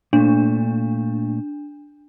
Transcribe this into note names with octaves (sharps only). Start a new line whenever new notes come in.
A#2 A3 D4